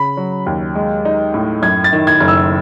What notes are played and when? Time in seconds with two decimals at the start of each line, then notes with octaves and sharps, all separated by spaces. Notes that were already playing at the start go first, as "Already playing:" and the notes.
Already playing: C#3 B5
0.17 F#3
0.46 D#2
0.75 G#3
1.05 D#4
1.34 A2
1.62 F#2 G#6
1.84 A6
1.93 D#3
2.07 G#6
2.20 F#1
2.28 E6